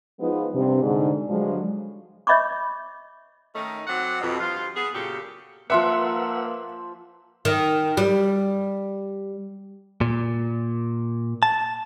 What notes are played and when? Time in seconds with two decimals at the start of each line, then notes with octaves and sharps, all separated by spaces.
0.20 F3 G#3 B3 D#4 F4 B4
0.53 G2 C3
0.82 G#2 D3
1.29 G2 D3 F3 F#3 G#3
2.27 C#5 D#5 E5 B5 C#6 D6
3.55 D#3 A3 C#4 D#4
3.87 F#3 C4 D5 F#5
4.21 F2 B2
4.40 G2 F3 F4
4.76 B3 G#4
4.94 F#2 A#2 C#3 G4 A4
5.70 F3 A#3 B4 E5 F#5 C6 D6 E6
7.45 D#3
7.97 G3
10.01 A#2
11.43 A5